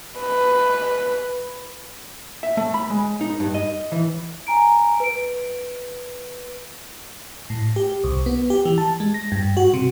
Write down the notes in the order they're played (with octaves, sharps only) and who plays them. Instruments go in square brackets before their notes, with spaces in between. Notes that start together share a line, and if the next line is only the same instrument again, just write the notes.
[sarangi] B4
[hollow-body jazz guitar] E5
A3
B5
G#3
D#4
G2
D#5
E3
[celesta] G#5 A#5 D7
B4 D7
[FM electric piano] A2
G4
C2
B3
G4
E3
A5
G#3
A#6
G2
F#4
C3